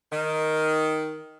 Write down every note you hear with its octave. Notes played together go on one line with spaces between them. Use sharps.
D#3